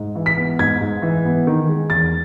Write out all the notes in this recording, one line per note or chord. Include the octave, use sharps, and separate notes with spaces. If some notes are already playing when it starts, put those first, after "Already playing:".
Already playing: G#2
E3
B6
B3
G#2 G#6
G#2
E3
B3
D#3
G#3
E2 A6